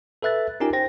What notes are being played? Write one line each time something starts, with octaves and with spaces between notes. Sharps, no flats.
A4 B4 E5 F#6 A6
C#4 D#4 F4 G4 A#4 G#5
C5 G5 A#6